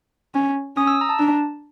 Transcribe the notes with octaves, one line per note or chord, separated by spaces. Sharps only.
C#4
C#4 D#6
E6
A#5
A5
D4